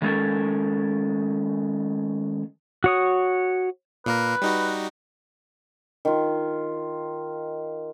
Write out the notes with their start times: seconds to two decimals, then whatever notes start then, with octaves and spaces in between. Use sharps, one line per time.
0.02 D#3 G#3 C#4 F4 A4 A#4
2.84 F#4 C#5 D#6
4.06 A#2 A#3 A#4 B4
4.42 G3 D#4 F#4
6.05 D#3 F4